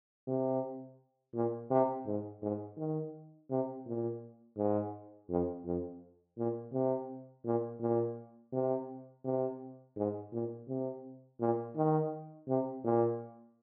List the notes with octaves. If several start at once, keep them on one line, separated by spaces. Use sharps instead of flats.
C3
A#2
C3
G#2
G#2
D#3
C3
A#2
G#2
F2
F2
A#2
C3
A#2
A#2
C3
C3
G#2
A#2
C3
A#2
D#3
C3
A#2